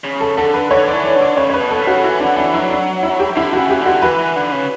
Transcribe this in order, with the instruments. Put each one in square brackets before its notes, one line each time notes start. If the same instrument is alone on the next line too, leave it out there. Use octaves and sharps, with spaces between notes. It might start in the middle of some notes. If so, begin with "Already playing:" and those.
[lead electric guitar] C#3
[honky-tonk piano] A4
[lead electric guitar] D3 [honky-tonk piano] A4
[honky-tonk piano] B4
[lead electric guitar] D3 [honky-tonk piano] C#5
[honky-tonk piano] D5
[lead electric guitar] E3
[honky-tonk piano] D5
[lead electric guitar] D3
[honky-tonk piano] D5
[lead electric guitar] C#3 [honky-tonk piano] C#5
[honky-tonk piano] C#5
B4
[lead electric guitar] B2
[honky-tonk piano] A4
[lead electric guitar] C#3
[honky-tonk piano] F#4
[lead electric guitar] E3 [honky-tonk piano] E4
[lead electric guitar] D3 [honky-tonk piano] D4
[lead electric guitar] E3 [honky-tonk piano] D4
[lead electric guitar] F#3 [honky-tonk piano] E4
[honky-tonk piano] D4
E4
G4
[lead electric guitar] D3 [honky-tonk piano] E4
[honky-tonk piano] F#4
[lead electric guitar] C#3
[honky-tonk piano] G4
[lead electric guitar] D3 [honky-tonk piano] F#4
[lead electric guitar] E3 [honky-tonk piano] B4
[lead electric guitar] E3
D3
C#3